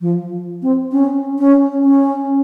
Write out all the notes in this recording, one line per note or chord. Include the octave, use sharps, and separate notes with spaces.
F3
C4
C#4
C#4
C#4